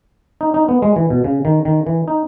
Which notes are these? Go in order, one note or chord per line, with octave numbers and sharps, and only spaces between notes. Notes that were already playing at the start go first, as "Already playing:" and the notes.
D#4
D#4
B3
G#3
E3
B2
C#3
D#3
D#3
E3
D#4